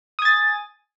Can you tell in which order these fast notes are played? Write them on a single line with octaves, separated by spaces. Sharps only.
D#6 G#5 A6